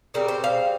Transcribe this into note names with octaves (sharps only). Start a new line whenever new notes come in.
C#3 G3 C4 A#4
C5
F5